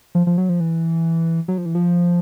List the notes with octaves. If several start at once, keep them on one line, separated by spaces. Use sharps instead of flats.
F3
F3
F#3
F3
E3
F#3
F3
E3
F3